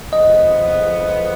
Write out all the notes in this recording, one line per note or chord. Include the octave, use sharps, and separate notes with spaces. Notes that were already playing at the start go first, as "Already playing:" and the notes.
F2 D3 F3 G#3 B3 D#5